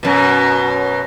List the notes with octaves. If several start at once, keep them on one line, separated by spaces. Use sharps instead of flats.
F#2 B2